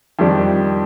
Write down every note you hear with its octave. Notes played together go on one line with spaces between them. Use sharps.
F2 D#3 G3 D4